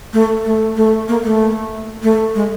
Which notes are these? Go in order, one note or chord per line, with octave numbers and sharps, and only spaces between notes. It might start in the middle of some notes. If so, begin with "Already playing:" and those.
A3
A3
A3
A#3
A3
A3
G#3